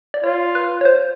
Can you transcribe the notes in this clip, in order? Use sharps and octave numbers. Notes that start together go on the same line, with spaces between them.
D5
F4 C#5
B4
C#5
C5